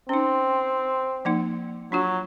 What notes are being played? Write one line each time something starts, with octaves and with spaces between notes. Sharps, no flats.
C4 C#4 D#4
F3 A#3 D#4
F#3 D4 F4 F#4